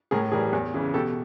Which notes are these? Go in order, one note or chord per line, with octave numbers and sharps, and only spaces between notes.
A2 G#4 A#4
E3 G3 G#4 A#4
E2
C#3 E3
B2 G4 A4